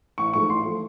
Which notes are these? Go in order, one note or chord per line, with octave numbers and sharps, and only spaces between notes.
A1 C#6
G#2 F3 A3 C#6
A1 C6
F3 A3